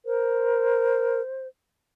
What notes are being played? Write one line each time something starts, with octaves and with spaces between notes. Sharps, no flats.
A#4 C5